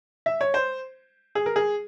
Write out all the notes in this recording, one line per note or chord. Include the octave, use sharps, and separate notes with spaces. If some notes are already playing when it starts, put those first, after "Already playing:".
E5
C#5
C5
G#4
A#4
G#4